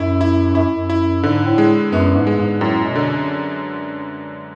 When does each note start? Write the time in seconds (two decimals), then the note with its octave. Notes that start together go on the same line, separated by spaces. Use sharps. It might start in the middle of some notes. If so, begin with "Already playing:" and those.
Already playing: F#2 E4
0.21 E4
0.55 F#2 E4
0.72 F#2
0.90 E4
1.23 G#2 D3
1.46 A2
1.58 G#3
1.92 F#2 B3
2.16 G#2
2.27 G#3
2.38 G#2
2.61 F#2 A2
2.84 B2
2.95 D3